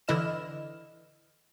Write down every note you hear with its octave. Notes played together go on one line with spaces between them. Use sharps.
D3 E3 E4 D#5 F6 E7